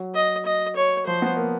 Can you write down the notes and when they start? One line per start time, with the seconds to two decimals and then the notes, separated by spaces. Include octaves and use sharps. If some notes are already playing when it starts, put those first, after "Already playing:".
Already playing: F#3
0.15 D#5
0.45 D#5
0.76 C#5
1.06 F3 C5
1.22 B3
1.37 A#3